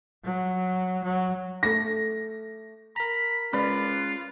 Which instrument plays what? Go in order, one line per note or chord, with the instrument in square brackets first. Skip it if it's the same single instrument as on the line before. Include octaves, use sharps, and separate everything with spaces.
[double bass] F#3
F#3
[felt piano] A3 A#6
[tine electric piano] A#4 A#5 [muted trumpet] B5
[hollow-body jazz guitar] G#3 C#4 [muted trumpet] F4 [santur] B4 D5